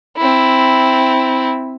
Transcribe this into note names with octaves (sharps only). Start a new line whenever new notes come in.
C4 E4